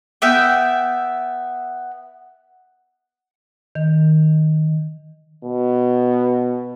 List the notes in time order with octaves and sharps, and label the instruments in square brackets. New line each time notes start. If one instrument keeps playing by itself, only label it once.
[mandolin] B3 E5 G5
[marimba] D#3
[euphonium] B2